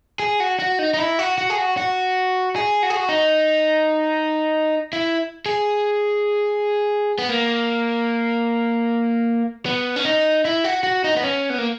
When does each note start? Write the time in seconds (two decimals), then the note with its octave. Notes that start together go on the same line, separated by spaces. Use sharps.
0.20 G#4
0.40 F#4
0.59 F#4
0.79 D#4
0.94 D#4
0.99 E4
1.19 F#4
1.38 F#4
1.50 G#4
1.58 F#4
1.77 F#4
2.56 G#4
2.83 F#4
2.90 G#4
2.97 F#4
3.09 D#4
4.93 E4
5.46 G#4
7.19 B3
7.29 A#3
9.66 B3
9.96 C#4
10.05 D#4
10.45 E4
10.64 F#4
10.83 F#4
11.04 D#4
11.17 B3
11.23 C#4
11.50 B3
11.58 A#3